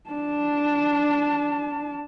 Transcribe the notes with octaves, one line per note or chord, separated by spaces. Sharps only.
D4 A5